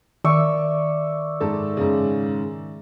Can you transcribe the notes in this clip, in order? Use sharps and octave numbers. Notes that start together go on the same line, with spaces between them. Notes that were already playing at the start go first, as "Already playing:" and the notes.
D#3 D5 E5 C#6
G#2 A4
G#2 C#3